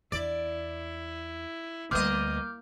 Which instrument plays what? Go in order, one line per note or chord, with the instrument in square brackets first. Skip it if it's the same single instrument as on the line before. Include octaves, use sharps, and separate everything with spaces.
[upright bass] E2 [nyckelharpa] E4 [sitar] D5
[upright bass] D2 G3 [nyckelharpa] A#3 [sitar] B3 D#5 [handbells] D6 F6 G6